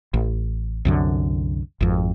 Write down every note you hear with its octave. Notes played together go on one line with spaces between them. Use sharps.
A1
C2 F#2 D3
G#1 F2